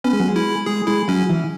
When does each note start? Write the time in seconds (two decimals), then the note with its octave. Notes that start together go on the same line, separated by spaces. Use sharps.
0.04 B3 C#4
0.13 G#3
0.20 F#3
0.28 G#3
0.36 E4
0.66 G#3 G#4
0.87 G#3 E4
1.08 F#3 C#4
1.29 E3